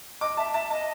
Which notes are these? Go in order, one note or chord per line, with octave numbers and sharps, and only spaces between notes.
D#5 D6
E5 A5
E5 A5
D#5 A5